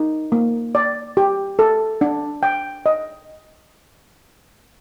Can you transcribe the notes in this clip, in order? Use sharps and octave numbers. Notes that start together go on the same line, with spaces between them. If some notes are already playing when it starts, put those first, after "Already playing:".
Already playing: D#4
A#3
D5
G4
A4
D4
G5
D#5